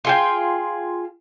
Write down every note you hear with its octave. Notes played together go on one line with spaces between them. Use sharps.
F4 G#4 G5